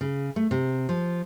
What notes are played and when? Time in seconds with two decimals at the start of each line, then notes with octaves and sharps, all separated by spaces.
0.01 C#3
0.36 A3
0.51 C3
0.89 F3